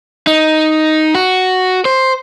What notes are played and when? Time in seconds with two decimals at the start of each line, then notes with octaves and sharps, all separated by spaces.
0.27 D#4
1.15 F#4
1.85 C5